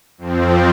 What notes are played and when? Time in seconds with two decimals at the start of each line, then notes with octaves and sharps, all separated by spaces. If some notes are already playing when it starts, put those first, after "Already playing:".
0.18 F2 F3 C4